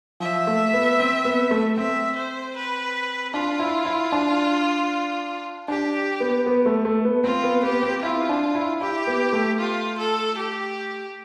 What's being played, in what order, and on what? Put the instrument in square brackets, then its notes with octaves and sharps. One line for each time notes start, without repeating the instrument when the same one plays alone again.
[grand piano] F3 [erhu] E5
[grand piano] A3
B3
C4
B3
A3
[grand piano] C4 [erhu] E5
[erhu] C5
B4
[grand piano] D4 [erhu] F4
[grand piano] E4
E4
D4
[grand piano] D4 [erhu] G4
[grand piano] B3
B3
A3
A3
B3
[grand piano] C4 [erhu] F4
[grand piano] B3
[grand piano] B3 [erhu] G4
[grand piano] C4
[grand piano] E4 [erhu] F4
[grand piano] D4
E4
[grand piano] E4 [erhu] G4
[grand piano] B3
A3
[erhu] F4
A4
G4